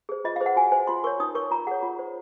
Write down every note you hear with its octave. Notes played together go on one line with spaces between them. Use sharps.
G#4 C5
F4 D#5
F5
G#4 C5
F#5
F#4 G#5
C5 G#5
F4 C6
A#4 C#5 C#6
D#4 D#6
A#4 C#5 C#6
F4 A#5
G#4 C#5 F#5
F4
C5